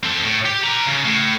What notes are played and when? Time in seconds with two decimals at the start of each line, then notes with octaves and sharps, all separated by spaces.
0.04 C4 A4
0.24 A2
0.45 G4
0.63 B4 A#5
0.86 C#3
1.05 A2